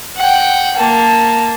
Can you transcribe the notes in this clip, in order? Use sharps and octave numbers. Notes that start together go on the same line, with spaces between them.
F#5 G5
A#3 A5